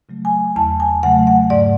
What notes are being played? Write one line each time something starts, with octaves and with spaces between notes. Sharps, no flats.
C#3 F#3 A3
G#5
E2 A5
G#5
C#3 F#3 A3 F#5
F#5
G#2 D5